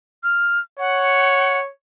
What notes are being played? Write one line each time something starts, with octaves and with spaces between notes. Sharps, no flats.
F6
C#5 F#5